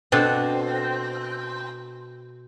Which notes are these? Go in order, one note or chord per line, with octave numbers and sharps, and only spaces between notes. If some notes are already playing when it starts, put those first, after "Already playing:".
B2 C4 D4 A4